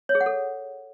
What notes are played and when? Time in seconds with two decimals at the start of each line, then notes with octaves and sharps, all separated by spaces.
0.09 C#5
0.15 G#4
0.21 F#5
0.26 A4